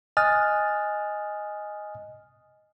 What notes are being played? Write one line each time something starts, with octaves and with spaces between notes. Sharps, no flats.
D#5 G#5 D#6 F6 F#6 A6